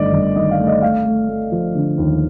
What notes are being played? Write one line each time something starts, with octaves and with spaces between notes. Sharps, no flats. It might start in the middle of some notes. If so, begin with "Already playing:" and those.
Already playing: G1 D#3 A3 D5 D#5
G1
D#3 D#5
F5
A3
D#5
A3 F5
A3
A3
F3
D3
D#2